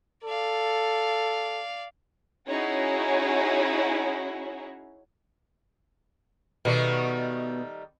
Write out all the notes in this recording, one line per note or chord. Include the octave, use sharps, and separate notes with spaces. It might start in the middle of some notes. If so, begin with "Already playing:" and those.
A4 D5 F5
C#4 D#4 E4 F#4 G#4 C#5
B2 D#3 G3 A3